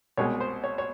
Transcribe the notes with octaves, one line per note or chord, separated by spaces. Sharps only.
C2 B2 G#3 C#5
C5
C#5
C#5